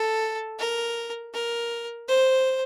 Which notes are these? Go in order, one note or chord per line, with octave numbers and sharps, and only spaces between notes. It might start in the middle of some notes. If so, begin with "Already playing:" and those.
Already playing: A4
A#4
A#4
C5